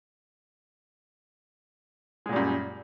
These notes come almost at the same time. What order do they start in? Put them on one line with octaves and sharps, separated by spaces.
G#3 A#2 G3 F#2